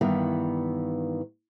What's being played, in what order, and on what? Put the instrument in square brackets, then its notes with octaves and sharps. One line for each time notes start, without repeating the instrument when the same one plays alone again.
[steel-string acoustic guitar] G2 D#3 E3 B3